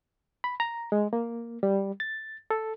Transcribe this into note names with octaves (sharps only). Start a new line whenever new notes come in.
B5
A#5
G#3
A#3
G3
A6
A4